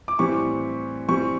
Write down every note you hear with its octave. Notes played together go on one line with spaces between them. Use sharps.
D6
A2 E3 G3 C4 C#6
E3 G3 C4 C#6